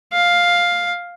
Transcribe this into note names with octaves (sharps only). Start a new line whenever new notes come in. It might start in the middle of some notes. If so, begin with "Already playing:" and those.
F5